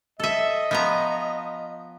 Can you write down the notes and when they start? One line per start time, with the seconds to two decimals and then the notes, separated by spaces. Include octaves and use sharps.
0.20 A4 D#5 E5
0.71 F3 B3 A#5